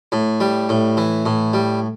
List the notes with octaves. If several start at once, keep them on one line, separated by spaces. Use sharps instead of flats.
A2
G3
A2
E3
A2
G3